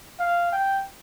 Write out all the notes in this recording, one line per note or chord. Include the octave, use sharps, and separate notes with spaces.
F5
G5